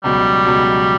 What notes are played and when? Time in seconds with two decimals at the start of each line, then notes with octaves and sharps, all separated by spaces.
0.04 C#2 B2 F#3 G3
0.46 C#2 B2 F#3